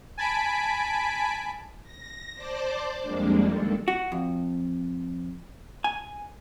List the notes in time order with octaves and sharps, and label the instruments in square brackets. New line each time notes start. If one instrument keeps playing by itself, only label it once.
[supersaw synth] G#5 A5 B5 B6 D7
[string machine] A#6
C5 D5 A5 D6
F2 G3 G#3 A#3 D4
D#3 A4
[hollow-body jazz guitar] F#4
F2
G#5